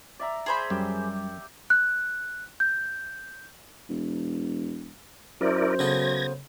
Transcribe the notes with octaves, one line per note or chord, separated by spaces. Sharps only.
D5 E5 A#5
G#4 C5 B5
F#2 G3 G4
F#6
G6
E1
F#2 E4 A#4 C5 D5
C#3 B3 A4 G#6 A#6